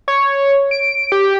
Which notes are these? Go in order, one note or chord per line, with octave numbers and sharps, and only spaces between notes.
C#5
D7
G4